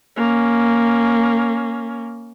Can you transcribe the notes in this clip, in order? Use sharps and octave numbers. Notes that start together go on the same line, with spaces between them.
A#3 C#4